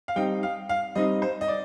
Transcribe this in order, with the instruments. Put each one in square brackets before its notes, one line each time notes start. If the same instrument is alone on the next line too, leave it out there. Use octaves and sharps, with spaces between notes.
[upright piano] F5
[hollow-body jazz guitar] G3 C4 D#4 [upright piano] G5
[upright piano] F5
F5
[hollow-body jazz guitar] G3 C4 D#4 [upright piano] D#5
[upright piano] C5
D#5
D5